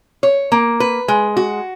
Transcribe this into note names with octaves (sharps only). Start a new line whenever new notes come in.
C#5
A#3
B4
G#3
F#4